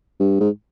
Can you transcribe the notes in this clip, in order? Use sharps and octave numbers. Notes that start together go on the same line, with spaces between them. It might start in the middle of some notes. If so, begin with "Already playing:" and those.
G2
G#2